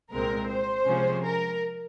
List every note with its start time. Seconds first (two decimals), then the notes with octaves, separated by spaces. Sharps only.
0.11 C2 A#2 G#3 C4 A#4
0.49 C5
0.87 C3 F3 G#3 C#4
1.24 A#4